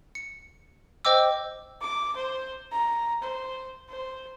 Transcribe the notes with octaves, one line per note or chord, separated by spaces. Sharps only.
C#7
C5 D#5 G5 D6 E6
D6
C5
A#5
C5
C5